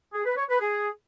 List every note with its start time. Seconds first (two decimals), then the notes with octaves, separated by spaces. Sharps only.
0.14 G#4
0.26 B4
0.37 C#5
0.49 B4
0.61 G#4